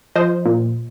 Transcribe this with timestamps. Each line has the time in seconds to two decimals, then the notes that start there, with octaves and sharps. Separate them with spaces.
0.15 F3 C5 D#5
0.46 A#2